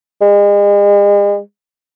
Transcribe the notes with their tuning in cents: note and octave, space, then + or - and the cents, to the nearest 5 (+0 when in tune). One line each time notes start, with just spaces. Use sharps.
G#3 -40